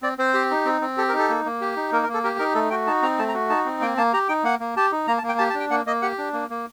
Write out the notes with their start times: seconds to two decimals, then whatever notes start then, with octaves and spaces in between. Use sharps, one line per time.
0.02 C4 D5
0.18 C4 C5
0.34 G4
0.51 D#4
0.65 C4
0.82 C4
0.97 G4 A4
1.09 A#4
1.13 D#4 A4
1.29 A#3
1.45 A#3
1.61 G4
1.76 D#4
1.92 A#3 A#4
2.03 A#4
2.08 A#3
2.14 A4
2.23 G4 A#4
2.39 D#4 A#4
2.55 A3 A4
2.70 F#4 G5
2.87 D#4 A5
3.02 C4 A#5
3.19 A3 A5
3.28 A#5
3.34 F#4
3.50 D#4 A5
3.65 C4
3.81 A#3 G5
3.98 A#3 A5
4.13 G4 A#5
4.28 D#4 G5
4.44 A#3 F#5
4.60 A#3
4.77 G4 A5
4.92 D#4
5.07 A#3 A#5
5.18 A5
5.23 A#3
5.29 G5
5.38 G4 A5
5.50 A5
5.54 D4
5.60 G5
5.70 A#3 F#5
5.86 A#3 D#5
6.02 G4 F#5
6.18 D4
6.33 A#3
6.50 A#3